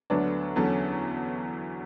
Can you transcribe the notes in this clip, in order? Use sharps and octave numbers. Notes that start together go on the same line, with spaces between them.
D2 D3 F#3 B3 D4
E2 D3 F#3 C#4 A5